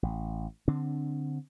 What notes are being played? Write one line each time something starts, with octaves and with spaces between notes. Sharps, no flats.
A1
D3 C4 D4